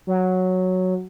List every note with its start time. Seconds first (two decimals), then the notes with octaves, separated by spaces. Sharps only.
0.07 F#3